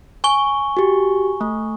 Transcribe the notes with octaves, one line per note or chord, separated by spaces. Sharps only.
G#5 C#6 G7
F#4 G4
A3